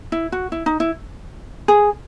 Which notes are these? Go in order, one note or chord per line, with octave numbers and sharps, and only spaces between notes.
E4
F#4
E4
D#4
E4
G#4